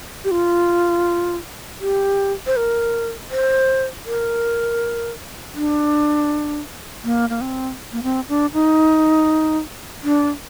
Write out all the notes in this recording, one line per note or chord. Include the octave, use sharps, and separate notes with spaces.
G4
F4
G4
C5
A#4
C5
A#4
D4
A#3
A#3
C4
A#3
C4
D4
D#4
D4